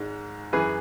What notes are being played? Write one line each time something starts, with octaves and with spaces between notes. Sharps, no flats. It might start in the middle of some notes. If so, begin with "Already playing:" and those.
Already playing: G#1 G#2 G#3
F#2 E3 G#4 B4